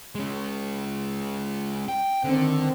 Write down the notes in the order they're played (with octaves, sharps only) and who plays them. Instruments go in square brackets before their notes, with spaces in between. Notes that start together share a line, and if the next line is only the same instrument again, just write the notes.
[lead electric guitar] G#3 C#4
G5
[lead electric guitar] D3 [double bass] D#3 C4